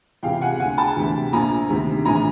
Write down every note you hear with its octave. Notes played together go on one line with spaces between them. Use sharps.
C#2 C3 E3 F5 G5
F#5 G#5
D2 D3 F#5 G#5
G5 A5
D2 C3 E3
A#1 A#2 G#5 A#5
D2 C3 D#3
A#1 A2 E3 G#5 A#5
G#5